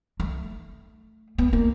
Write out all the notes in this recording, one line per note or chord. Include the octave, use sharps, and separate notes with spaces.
A3
B3
A#3